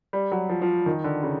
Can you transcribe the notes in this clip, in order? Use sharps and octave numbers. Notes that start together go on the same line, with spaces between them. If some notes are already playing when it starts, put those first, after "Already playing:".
G3
F#3
F3
F3
D#3
D3
C#3